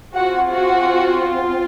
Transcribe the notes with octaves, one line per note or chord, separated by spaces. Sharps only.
C4 F4 F#4 G#4 F#5
F#4 F#5